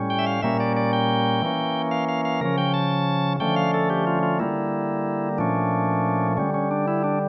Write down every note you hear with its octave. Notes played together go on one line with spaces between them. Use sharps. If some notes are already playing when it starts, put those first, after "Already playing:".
Already playing: A2 G3 C#4
G5
E5
F5
A#2 G3 A#3 C#4 E5
D5
D5
G5
E3 A#3 C#4
F5
F5
F5
C#3 F3 C#4 A#4
G5
A5
D3 F3 A3 C#4 G5
F5
A4
G4
F4
F4
D3 G3 A#3 E4
A#2 F3 A3 C#4 D4
D3 G3 C#4
C#4
D4
E4
D4